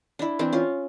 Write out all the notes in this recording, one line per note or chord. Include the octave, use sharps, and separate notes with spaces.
D4 E4
E3 C4 D4
C#4 F4